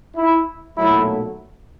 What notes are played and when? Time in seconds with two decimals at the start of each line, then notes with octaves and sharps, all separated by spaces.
0.16 E4
0.77 B1 A#2 F#3 A3 E4